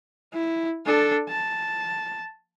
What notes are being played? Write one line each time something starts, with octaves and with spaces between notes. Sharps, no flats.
E4
D4 A4
A5